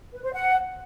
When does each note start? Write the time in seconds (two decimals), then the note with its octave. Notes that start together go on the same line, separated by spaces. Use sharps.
0.13 B4
0.23 C5
0.34 F#5